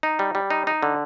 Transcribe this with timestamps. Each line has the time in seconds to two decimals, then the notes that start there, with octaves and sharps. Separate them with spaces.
0.03 D#4
0.19 G3
0.35 G3
0.50 D#4
0.67 D#4
0.83 D3